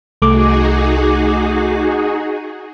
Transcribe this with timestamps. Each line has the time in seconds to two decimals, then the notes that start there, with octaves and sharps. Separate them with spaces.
0.22 C2 A3 D#4 F#4 G#4 D6